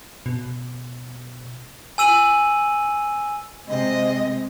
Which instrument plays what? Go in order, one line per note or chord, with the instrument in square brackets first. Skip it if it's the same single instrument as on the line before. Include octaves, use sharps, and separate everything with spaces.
[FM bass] B2
[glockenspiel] G#5 E6 D#7 F#7
[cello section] C3 G#3 C4 [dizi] D#5